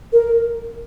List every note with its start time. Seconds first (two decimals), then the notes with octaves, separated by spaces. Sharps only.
0.13 A#4